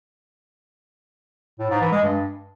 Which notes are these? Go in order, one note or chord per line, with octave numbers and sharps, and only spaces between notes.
A2
G#2
E3
G#3
G2